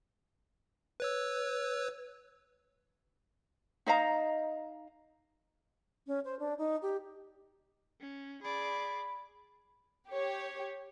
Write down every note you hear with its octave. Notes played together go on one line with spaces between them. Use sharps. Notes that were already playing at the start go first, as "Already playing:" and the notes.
B4 C#5 E6
D#4 D#5 F5 A#5
C#4
C5
D4
D#4
G4
C#4
G#4 D5 B5
G4 C#5